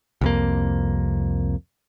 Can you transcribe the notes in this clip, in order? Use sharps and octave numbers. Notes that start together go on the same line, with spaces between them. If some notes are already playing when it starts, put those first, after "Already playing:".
C2 F2 A#3